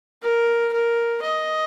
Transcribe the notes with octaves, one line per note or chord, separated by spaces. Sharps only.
A#4
A#4
D#5